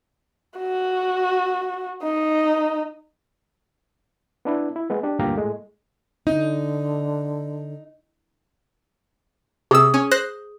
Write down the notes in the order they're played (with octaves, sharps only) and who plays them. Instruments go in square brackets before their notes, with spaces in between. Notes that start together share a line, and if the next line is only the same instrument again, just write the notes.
[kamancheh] F#4
D#4
[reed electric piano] B3 D4 E4
E4
G#3 B3
D4 G4
D2 G2 A#2 G4 F5 A#5
A2 G#3 A3
[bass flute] D3 [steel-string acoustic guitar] D#4
[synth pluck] C3 E6 [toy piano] G#4 D#6
[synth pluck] C#4
C5 F#6 A#6